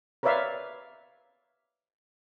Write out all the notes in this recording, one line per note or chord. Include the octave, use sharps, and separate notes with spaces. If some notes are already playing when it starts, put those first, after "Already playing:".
A#4 B4 C#5 D5 E5 F5